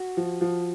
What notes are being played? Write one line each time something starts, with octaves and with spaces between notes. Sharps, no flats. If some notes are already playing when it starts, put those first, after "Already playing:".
Already playing: F#4
F3
F3